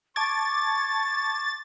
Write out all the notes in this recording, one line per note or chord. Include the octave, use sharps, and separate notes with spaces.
A5 C#6 D6 G#6 A6